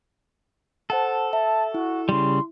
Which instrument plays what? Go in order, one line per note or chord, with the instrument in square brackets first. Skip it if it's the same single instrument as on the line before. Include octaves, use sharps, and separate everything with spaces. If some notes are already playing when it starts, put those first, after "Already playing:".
[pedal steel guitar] A4 [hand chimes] C5 F#5 A5
[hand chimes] E5 [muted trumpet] A5
[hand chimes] E4 [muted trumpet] F#4
[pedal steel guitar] C#3 G3 [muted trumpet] C6